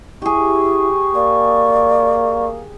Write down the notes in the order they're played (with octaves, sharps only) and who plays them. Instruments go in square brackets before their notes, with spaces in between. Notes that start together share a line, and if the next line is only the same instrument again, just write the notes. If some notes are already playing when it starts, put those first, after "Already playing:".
[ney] E4 [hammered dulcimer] G4 G#4 [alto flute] C#6
[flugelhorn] A#3 [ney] D5